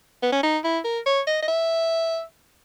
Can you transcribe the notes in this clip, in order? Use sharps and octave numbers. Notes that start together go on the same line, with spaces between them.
B3
C#4
D#4
E4
A#4
C#5
D#5
D#5
E5